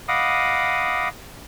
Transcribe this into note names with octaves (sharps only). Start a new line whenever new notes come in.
D#5 F5 F#5 B5 D6 D#6